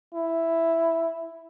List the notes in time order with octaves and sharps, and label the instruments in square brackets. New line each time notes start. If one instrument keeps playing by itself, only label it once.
[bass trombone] E4